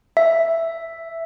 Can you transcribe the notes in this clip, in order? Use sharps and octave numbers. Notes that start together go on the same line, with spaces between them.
E5